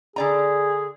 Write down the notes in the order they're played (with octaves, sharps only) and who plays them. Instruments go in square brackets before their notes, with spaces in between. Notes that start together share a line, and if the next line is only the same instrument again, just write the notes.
[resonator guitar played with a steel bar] D3 D5 A#5 [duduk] G#4